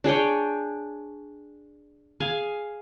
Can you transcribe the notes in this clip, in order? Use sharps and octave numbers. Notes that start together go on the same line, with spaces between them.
D4 G#4 C#5 G5
G#4 F5 G#5